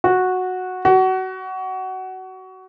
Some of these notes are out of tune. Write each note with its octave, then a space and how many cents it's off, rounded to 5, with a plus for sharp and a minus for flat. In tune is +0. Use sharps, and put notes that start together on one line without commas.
F#4 -10
F#4 +20